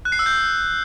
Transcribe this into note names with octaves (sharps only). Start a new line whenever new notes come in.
F#6
C7
E6
G6